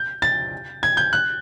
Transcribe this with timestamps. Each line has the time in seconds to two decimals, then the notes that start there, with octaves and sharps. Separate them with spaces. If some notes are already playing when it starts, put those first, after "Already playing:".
Already playing: G6
0.22 A6
0.83 G#6
0.97 G6
1.13 F#6